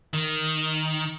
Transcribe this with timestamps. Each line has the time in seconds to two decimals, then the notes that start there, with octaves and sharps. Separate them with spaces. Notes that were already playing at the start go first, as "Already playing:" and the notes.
0.13 D#3